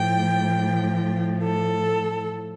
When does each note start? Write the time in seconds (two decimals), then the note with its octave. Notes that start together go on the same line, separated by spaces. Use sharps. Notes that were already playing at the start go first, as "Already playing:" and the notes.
Already playing: A2 F3 G5
1.43 A4